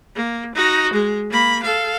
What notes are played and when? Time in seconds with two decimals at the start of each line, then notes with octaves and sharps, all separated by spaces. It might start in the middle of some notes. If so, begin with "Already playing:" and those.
0.16 A#3
0.55 D#4 F#4
0.93 G#3
1.31 A#3 B5
1.63 A4 F5